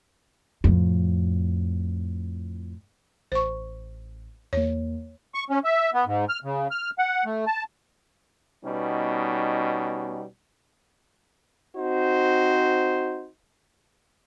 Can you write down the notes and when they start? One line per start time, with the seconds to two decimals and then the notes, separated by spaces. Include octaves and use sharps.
0.64 F2 A2
3.32 A1 C5 C#6
4.53 E2 A#3 C#5
5.35 C#6
5.50 C#4
5.64 E5
5.94 B3
6.06 G#2
6.29 F6
6.44 C#3
6.71 F6
6.98 F#5
7.25 A3
7.46 A5
8.65 B2 G3 B3 C#4 D#4
11.75 C4 D#4 F#4 C5